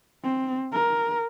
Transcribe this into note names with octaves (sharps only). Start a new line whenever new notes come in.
C4
A#4